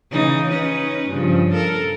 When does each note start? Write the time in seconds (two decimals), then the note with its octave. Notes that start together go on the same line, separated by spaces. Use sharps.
0.11 C#3 E3 D#4
0.50 C#4 D#4 B4
1.10 G2 C#3 F3
1.53 A4 A#4